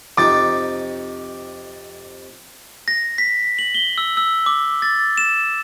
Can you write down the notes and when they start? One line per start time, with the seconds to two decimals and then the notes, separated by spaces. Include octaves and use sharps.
0.17 F2 C3 D#4 D6 A6
2.88 A#6
3.18 B6
3.59 F#7
3.75 G7
3.98 E6
4.17 E6
4.46 D6
4.82 A6
5.18 E7